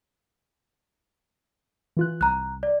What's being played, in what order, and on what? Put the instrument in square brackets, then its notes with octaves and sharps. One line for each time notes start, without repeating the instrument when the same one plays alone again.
[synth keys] E3 F4 F#6
[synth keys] C2 [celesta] A#5 F#6
[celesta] D5